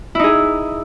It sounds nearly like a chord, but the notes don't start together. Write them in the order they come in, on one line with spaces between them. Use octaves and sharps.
E4 D#4 G#4